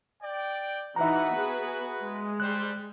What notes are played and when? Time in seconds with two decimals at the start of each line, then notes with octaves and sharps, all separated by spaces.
0.22 D5 G5
0.96 E3 D#4 F#4 B4 E5 F#5 A#5
1.34 B3 G#4
2.01 G#3
2.40 G3 C5 F#6